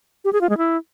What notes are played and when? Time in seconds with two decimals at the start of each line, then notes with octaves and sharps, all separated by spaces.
0.25 G4
0.33 G#4
0.41 F4
0.49 G#3
0.58 E4